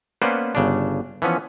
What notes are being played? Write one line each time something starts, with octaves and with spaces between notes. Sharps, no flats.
A#3 B3 C#4 B4 C5 D5
G1 C#3 D4
E3 F3 B3 C#4